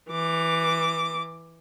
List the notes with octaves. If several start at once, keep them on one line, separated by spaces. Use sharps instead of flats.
E3 D6